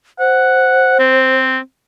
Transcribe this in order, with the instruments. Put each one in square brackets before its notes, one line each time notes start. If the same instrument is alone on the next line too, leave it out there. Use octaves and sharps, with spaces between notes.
[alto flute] C5 [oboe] F#5
[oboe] C4